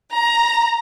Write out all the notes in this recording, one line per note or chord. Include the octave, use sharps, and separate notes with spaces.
A#5